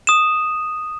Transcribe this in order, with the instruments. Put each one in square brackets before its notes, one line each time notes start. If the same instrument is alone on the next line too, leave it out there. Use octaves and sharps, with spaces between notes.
[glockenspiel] D#6 E7